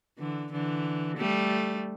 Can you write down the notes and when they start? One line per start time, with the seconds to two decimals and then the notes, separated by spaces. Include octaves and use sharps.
0.19 D3 E3
0.52 D3 E3
1.18 G3 A3